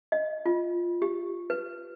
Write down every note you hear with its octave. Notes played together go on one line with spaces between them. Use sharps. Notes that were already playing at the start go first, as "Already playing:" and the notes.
D#5
F4
G4
B4